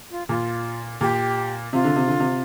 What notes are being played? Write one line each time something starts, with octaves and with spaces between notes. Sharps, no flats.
F4
A#2 F4
A#2 G4
C3 F4
D3
C3
D3
C3